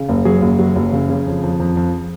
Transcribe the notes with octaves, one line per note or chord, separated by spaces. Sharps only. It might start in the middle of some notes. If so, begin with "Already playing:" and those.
Already playing: C#3
F#1
F#3 G#4
F#1
F#3
F#1
C#3
C#3
F2
F2
F2
F2